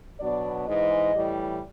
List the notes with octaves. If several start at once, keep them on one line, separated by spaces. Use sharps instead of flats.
B2 F#3 B3 D4 D5
G#2 E3 G#3 D#5
A2 E3 G3